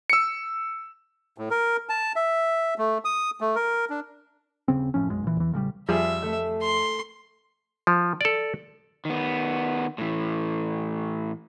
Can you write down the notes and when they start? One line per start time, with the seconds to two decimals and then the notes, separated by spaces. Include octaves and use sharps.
0.10 E6 C#7
1.38 A2
1.51 A#4
1.89 A5
2.16 E5
2.78 A3
3.05 D#6
3.41 A3
3.56 A#4
3.90 D4
4.68 D#1 C#3 C4
4.94 F#1 A2 F3 C#4
5.10 B1 F#2 G#3
5.24 A#2 E3
5.37 E2 E3
5.52 A1 C#3 F#3 G3
5.89 F2 F3 G3 G#4 E5
6.22 A3
6.62 C6
7.87 F3
8.21 A4 D5
9.05 D#3 B3
9.98 A2 E3